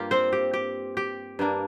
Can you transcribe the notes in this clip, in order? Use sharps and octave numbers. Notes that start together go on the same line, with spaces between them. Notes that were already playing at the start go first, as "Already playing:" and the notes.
Already playing: G2 G3 A#3 F4 G4
C4 C5
G4
G4
G4
G2 G3 A#3 D4